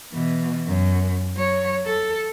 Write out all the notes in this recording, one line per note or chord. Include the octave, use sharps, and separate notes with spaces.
B2 E3
F#2
F#3 C#5
A4